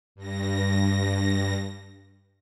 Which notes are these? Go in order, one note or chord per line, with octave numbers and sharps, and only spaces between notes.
G2 A#6